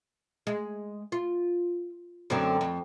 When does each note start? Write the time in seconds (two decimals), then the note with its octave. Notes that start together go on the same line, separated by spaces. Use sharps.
0.47 G#3
1.12 F4
2.30 F#2 D3 C4
2.61 F2